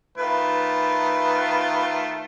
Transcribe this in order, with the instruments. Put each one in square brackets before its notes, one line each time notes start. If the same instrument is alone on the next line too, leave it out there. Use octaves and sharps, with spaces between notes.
[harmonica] D#3 A3 F4 [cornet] B4